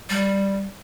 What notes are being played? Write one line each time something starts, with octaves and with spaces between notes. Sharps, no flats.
G3